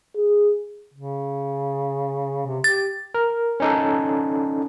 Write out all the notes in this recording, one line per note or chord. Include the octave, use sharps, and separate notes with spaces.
G#4
C#3
C3
G4 A6
A#4
C#4 D#4 A4